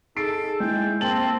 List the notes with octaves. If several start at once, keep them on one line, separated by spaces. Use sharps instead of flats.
D#4 G#4 A4 C7 D7
G#3 E4 G5
A#3 C4 A5 F#7